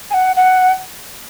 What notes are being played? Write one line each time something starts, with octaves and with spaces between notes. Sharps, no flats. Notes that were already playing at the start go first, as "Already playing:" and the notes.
G#5
F#5
F#5